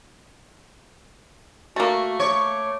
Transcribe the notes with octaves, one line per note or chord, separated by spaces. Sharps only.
A3 A#3 F#4
C#5 D6